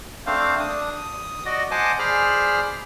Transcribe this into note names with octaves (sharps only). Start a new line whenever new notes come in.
A3 C4 D4 C5 F5
D4 D#6
D#6
F#4 D5 D#5
C5 D#5 F#5 G#5 A5 D6
G#4 C5 D5 B5 F6